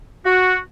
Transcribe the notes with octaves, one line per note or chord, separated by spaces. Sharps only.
F#4